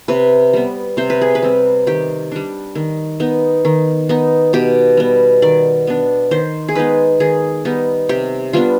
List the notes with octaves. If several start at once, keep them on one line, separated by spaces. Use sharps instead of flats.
C3 B4
G3 B3
C3 C5
B4
G#4
B4
G3 C4
D#3 G4
G3 D4
D#3
B3 D#4
D#3
B3 D#4
B2 G4
G3 B3
D#3 D5
B3 D4
D#3 C5
G#4
G#3 B3 D#4 B4
D#3 G#4
G3 B3 D#4
C3 G4
G3 B3 D4 F4